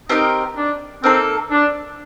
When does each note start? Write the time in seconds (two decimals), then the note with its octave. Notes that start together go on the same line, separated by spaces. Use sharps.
0.09 C4 D#4 G4 A#4 D#5
0.57 D4
1.03 A#3 C4 D#4 A4
1.51 D4